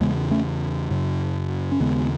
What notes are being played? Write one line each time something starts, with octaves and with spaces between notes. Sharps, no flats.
E2 C#3 G#3 B3
A3 C#4
F#2 C#3
C#4
D#2 C#3 G#3 B3